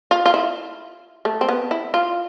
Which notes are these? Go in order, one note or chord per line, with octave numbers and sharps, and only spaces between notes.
F4
F4
E4
A3
C4
B3
E4
F4